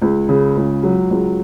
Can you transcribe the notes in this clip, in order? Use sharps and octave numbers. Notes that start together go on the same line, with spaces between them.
C#2
C#3
C#2
F#3
C#2